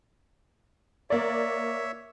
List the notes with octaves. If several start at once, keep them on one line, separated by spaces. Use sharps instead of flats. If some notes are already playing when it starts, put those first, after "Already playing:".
A#3 C#5 D5 E5